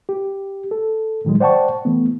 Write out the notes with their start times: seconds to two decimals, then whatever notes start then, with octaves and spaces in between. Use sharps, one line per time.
0.09 G4
0.71 A4
1.25 A2 D#3 F#3 G#3
1.40 C5 D5 F#5 G5 A5 C#6
1.85 E3 A3 B3